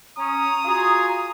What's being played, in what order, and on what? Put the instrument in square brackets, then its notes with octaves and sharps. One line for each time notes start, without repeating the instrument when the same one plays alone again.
[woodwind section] C#4 [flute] A#5 [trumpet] D#6
[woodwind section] F4 F#4 G#4